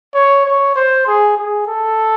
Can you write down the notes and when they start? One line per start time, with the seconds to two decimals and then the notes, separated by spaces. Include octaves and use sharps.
0.15 C#5
0.46 C#5
0.76 C5
1.07 G#4
1.37 G#4
1.67 A4